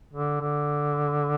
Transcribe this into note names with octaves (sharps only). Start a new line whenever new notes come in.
D3
D3